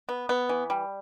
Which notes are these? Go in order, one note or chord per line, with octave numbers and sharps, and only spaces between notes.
B3
B3
E3
G3